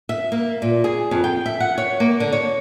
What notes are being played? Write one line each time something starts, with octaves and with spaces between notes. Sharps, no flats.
E5
A#3
A#2
G#4
F2
G5
E5
F#5
C#5
A#3
D3
C#5